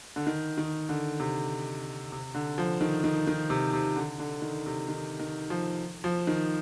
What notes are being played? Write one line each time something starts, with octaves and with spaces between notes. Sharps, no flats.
D3
D#3
D#3
D3
C3
C3
D3
F3
D#3
D#3
D#3
C3
C3
D3
D3
D#3
C3
D#3
D#3
F3
F3
D#3